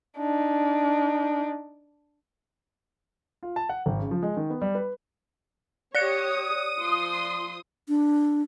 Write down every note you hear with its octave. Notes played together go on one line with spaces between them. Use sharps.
D4 D#4
F4
A5
F#5
G#1
C#3
F3
G#3
D#3
B3
G3
B4
G4 C#5 D5 D#6 F#6 C#7
F3 C6
D4